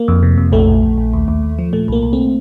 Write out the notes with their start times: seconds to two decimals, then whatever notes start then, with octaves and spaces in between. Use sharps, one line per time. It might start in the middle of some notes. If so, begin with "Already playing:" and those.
Already playing: A#3
0.08 F2
0.23 C3
0.38 F2
0.52 A#1 A3
0.68 A#1
0.83 A#1
0.98 A#1
1.13 D#2
1.28 D#2
1.43 D#2
1.59 F3
1.73 A#2 A3
1.88 C2 A#3
2.03 C2
2.13 A3 C4